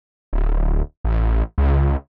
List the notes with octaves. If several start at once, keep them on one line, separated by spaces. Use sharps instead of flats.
D1
A1
C#2